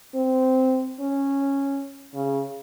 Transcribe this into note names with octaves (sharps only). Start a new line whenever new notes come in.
C4
C#4
C#3